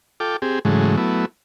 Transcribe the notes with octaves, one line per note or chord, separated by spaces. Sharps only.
F4 A4 G5 D6
C4 G4 G#4
G#2 C#3 E3 F#3 G#3 A3
F#3 A3 B3 E4